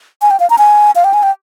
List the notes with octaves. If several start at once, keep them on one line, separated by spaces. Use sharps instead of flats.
G#5
G5
F5
A#5
G#5
F5
G5
G#5
G5